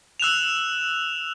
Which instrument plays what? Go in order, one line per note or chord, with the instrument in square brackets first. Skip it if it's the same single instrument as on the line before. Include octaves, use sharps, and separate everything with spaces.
[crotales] E6 F#6 E7 F7